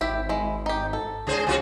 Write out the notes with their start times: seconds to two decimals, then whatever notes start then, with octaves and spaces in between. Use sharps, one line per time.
0.01 G#1 E4 G4 E5
0.29 G#3 E4
0.66 D#4 G4
0.93 A4
1.27 C#2 C#3 G#4 C5
1.47 C3 F4 F#4